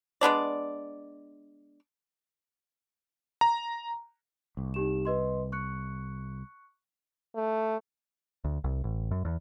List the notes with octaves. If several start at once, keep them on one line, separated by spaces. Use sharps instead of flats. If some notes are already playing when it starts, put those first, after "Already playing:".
G#3 B3 D4 D5
A#5
C2
D#4 G4 E7
B4 D#5 C6
C#6 F#6 C#7
A3
D2
C2
A1
F#2
E2